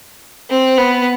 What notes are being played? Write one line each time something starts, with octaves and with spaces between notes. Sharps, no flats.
C4
B3